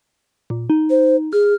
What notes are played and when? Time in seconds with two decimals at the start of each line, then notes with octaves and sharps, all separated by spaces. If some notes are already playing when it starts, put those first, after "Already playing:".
0.50 A#2
0.70 D#4
0.90 C5
1.33 G#4 F6